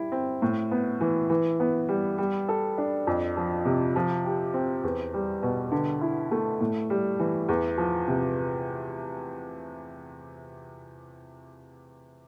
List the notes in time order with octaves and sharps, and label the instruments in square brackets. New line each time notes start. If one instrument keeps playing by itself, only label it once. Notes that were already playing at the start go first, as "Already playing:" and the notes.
Already playing: [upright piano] G3 E4
C4
A2
B3
E3
E3
B3
G3
G3
A4
D4
F2
F3
C3
F3
G4
C4
E2
G3
B2
D3
E4
A3
A2
G3
E3
E2
F3
C3